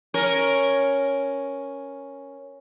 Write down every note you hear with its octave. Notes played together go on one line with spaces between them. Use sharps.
C#4 A#4